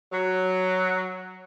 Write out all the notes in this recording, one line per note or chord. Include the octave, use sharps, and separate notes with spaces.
F#3